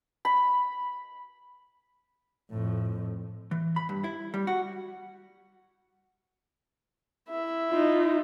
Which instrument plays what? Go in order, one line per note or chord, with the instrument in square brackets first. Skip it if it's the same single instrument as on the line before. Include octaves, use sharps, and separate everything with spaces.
[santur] B5
[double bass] F2 A2
[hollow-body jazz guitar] E3
B5
G2
E4
G3
F#4
[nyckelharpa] E4 E5
[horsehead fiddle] D#4 F4